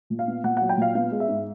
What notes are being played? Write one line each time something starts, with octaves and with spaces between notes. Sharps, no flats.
A#2
F5
B3
A#2 F#5
F#5
F#3
G5
A#2 F5
B3 F5
G#3
E5
G#2